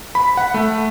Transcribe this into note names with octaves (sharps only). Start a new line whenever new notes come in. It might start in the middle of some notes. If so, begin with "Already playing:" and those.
B5
F#5
A3